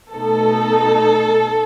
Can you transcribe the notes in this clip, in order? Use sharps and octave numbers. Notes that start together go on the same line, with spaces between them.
B2 A3 D#4 A4